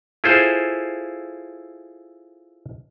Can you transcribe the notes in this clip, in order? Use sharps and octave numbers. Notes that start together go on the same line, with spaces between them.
E4 F4 G#4 A4 C5